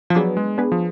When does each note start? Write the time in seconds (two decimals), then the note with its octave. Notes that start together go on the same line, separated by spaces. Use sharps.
0.10 F3
0.15 F#3 B3 D4 G#4 B4
0.37 G#3
0.58 B3 D4 G#4 B4
0.72 F3